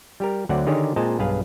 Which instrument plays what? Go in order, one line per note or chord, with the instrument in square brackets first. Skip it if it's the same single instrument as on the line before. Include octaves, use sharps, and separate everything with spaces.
[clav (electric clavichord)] G3 G4 A#4
D2 D3 F#3 C4 D5 F#5
D3 D#3 D#4 G4 G#4 C#5
A#2 G#3 C4 D#5 A5 A#5
B1 G2 G#4 B4 F5